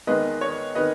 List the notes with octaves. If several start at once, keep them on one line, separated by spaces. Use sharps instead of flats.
E2 D#3 G#3 B4 D#5
C#5
D#3 B4 D#5